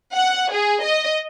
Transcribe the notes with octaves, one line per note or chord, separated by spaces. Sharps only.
F#5
G#4
D#5